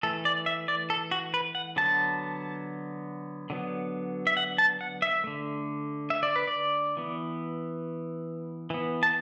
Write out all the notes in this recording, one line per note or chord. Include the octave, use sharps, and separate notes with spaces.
E3 A3 A4
D5
E5
D5
A4
F#4
B4
F#5
D3 F#3 B3 A5
D3 F#3 B3
E5
F#5
A5
F#5
E5
D3 A3
E5
D5
B4
D5
E3 B3
E3 B3
A5